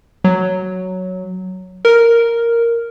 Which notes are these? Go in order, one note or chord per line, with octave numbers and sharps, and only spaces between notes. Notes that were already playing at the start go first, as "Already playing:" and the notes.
F#3
A#4